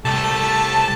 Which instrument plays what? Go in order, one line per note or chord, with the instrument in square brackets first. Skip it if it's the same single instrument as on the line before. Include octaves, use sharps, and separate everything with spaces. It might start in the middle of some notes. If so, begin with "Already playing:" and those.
[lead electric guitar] C2 [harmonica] A3 G4 A4 [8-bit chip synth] A5